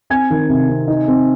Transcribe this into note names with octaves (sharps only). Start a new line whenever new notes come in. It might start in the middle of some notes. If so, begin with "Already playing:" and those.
C4 G#5 G#6
D#3
C3
C4
D#4
C4